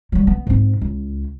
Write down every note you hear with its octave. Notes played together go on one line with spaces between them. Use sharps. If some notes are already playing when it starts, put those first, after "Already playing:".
F#3 G3
B3
G#2 C4
C#2